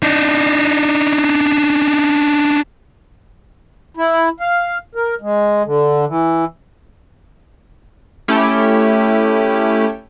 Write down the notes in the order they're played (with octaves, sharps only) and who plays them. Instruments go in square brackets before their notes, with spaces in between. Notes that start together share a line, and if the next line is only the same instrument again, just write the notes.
[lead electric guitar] D4 D#4
[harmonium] E4
F5
A#4
G#3
D3
E3
[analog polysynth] A3 C#4 E4 G4